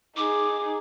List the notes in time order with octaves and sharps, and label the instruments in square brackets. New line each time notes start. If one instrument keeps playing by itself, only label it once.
[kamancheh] D#4 G#4 [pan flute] D6